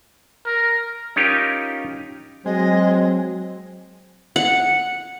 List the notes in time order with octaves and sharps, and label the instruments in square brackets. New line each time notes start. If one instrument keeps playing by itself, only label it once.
[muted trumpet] A#4
[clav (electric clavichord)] C#4 D#4 F4 G4 A#4
[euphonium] F#3 [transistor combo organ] G#3 [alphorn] C4 [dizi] D#5
[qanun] F#5